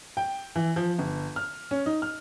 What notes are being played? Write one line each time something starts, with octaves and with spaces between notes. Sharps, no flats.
G5
E3
F3
G1
F6
C#4
D#4
F6